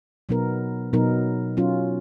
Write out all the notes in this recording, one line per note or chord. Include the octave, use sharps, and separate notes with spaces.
B2 F#3 B3 D#4 A#4
B2 F#3 B3 D#4 A#4
F#3 C#4 F4